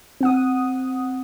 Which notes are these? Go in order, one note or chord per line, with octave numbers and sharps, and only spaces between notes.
C4 F#5 D#6